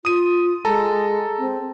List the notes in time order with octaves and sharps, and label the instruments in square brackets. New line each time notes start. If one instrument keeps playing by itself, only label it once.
[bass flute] F4 [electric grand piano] D#6 D#7
[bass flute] G#3 [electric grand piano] A4 A5 A#5
[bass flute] C4